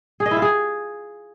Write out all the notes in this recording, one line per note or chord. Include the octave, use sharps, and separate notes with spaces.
G#4
D#5
E4
F4
G#4